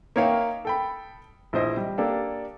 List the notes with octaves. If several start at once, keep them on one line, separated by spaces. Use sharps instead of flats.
A#3 D#4 C#5 E5 F5 G5
A4 G5 B5
A#1 E4 C5 D#5
G3
A#3 D4 G4 A4 F5